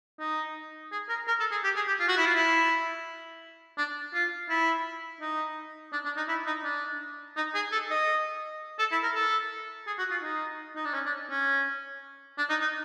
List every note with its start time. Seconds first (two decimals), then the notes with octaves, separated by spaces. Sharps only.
0.20 D#4
0.92 G#4
1.09 A#4
1.27 A#4
1.40 A4
1.51 G#4
1.64 G4
1.76 G#4
1.87 G4
2.00 F4
2.08 F#4
2.17 E4
2.26 F4
2.35 E4
3.78 D4
4.14 F4
4.50 E4
5.21 D#4
5.93 D4
6.05 D4
6.17 D#4
6.29 E4
6.47 D#4
6.64 D4
7.36 D#4
7.55 G#4
7.72 A4
7.90 D#5
8.79 A4
8.92 E4
9.03 A#4
9.15 A4
9.87 G#4
9.98 F#4
10.11 F4
10.23 D#4
10.76 D#4
10.85 D4
10.94 C#4
11.06 D4
11.30 C#4
12.38 D4
12.50 D#4
12.61 D#4